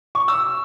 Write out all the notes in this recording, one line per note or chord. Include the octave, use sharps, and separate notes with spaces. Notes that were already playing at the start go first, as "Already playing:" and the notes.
C#6
E6